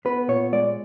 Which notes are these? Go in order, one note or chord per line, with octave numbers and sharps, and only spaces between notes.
B3 B4
A#2 C#5
G#3 D5